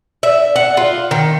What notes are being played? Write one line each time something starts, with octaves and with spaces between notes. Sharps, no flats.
E5
F#5
F4
D#3